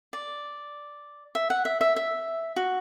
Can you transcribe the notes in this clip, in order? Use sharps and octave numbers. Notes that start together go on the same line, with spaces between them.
D5
E5
F#5
E5
E5
E5
F#4